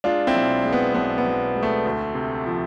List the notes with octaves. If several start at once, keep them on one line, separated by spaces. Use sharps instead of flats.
G#3 D4 F4
C4 E4
B1
G#3
B3
B1 B3
B3
B1
G#3
A3
D2
C3
F3